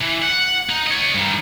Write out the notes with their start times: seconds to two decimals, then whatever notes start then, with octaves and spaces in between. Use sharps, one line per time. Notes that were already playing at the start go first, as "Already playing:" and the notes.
0.01 E3
0.22 F#5
0.69 D#4
0.87 C#5 D#5
1.14 G2 D#3